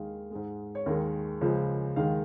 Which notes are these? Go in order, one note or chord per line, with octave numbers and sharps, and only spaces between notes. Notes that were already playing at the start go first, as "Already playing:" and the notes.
Already playing: D#2 D#3 G#3 F5
G#2 G#3
C#5
D#2 D#3 G#3 A#4
C#2 C#3 F3 G#3
D#2 D#3 G#3 F5